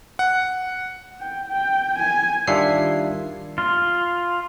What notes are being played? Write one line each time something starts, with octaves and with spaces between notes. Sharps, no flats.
F#5
G5
G5
G#5
D#3 G3 D4 F4 E5 C7
F4